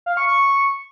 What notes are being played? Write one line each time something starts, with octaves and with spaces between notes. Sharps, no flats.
F5
C#6
C#6